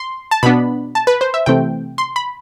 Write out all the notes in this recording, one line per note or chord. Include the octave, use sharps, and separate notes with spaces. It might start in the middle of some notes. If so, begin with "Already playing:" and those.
Already playing: C6
A5
B2 B3 D4 B5
A5
B4
C5
E5
C3 E3 A3 C4 G5
C6
B5